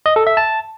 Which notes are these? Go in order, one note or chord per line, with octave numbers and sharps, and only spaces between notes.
D#5
A4
E5
A5